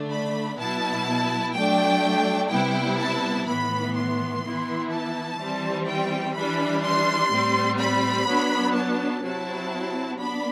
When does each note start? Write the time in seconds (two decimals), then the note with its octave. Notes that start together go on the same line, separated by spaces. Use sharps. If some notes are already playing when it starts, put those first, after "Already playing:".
Already playing: D3 A3 D4
0.10 B5
0.58 B2 F#3 B3 E4 A5
1.54 F#3 A3 D4 G5
2.50 C3 G3 B3 E4 G5
2.98 A5
3.46 A2 E3 B3 B5
3.95 C6
4.42 E3 B3 E4
4.91 A5
5.39 E3 G3 C4
5.86 G5
6.35 E3 G3 D4 B5
6.83 C6
7.31 A2 G3 C4
7.79 B5
8.27 F#3 B3 D4
8.75 A5
9.23 C3 F#3 C4 E4 A5
10.19 B3 D4 B5